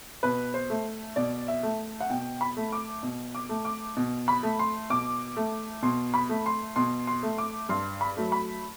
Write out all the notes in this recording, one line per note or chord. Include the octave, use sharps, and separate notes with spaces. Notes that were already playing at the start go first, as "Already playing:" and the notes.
B2 B4
C5
A3
B2 D5
E5
A3
F#5
B2 G5
B5
A3
D6
B2
D6
A3
D6
B2
B5
A3
C6
B2 D6
A3
B2 C6
B5
A3
C6
B2 C6
C6
A3
D6
G2 C6
B5
F#3 A3
B5